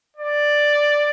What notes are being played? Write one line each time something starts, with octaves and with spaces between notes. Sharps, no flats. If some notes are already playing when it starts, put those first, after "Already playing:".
D5